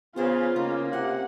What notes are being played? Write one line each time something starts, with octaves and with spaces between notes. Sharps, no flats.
E2 C#3 B3 F4 C5 C#5
C#3 A#3 D#4
C3 C4 F#5 G#5